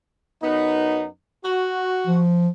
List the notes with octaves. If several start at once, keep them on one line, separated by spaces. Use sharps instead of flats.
F#2 B3 D#4
F#4
F3